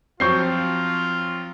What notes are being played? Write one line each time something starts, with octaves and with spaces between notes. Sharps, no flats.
F3 F#3 C4 F4 C#6 G6 C7